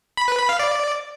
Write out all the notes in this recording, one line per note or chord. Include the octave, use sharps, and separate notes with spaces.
B5
B4
B5
F5
D5